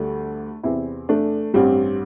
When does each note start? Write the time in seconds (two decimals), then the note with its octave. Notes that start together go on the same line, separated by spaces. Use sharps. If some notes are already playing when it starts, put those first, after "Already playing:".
Already playing: D2 D3 G3 A3 D4
0.63 E2 C3 E3 C4 E4
1.09 A3 D4
1.54 A1 G2 G3 C4